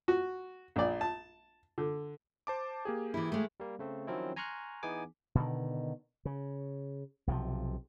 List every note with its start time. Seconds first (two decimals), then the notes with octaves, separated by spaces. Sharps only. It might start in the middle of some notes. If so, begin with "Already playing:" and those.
0.08 F#4
0.76 A#1 A#2 D5
1.01 A5
1.78 D3
2.47 C5 A5 D6
2.85 A#3 G4 G#4
3.14 E3 E4
3.32 G#3 A3
3.60 G3 A#3
3.79 C#3 A3 C4
4.07 D#3 F3 F#3 C4 C#4 E4
4.36 G#5 A#5 C6 C#6 F6 F#6
4.83 E3 B3 D#4 G#4 G#5 D6
5.35 B2 D3 D#3
6.25 C#3
7.27 B1 C3 D#3 F3